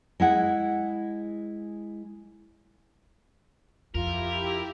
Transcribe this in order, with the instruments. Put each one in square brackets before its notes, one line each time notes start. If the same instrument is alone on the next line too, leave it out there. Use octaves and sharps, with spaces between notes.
[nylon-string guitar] G#3 E4 F#5
[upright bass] F2 [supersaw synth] E4 G4 [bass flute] F4 [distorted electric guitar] A#4